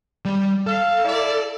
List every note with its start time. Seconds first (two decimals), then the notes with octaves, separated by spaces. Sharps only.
0.25 G3 D5
0.67 A4 F5
1.05 E4 D5